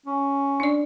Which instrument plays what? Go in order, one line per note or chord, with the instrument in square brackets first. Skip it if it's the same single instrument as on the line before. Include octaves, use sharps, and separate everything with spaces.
[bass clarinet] C#4
[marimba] D4 D5